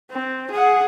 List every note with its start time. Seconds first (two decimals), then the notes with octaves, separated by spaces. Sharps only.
0.11 C4
0.51 G#4 F#5